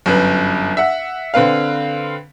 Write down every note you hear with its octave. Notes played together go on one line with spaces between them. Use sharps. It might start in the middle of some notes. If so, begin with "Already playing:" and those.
G1 F#2 B4
E5 F#5
D3 C4 B4 F5